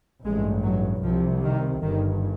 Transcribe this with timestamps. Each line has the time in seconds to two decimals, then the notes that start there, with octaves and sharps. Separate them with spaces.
0.24 A1 G2 G#3
0.63 F#3
1.03 C2 C3 F3
1.43 D#3
1.82 G1 G2 D#3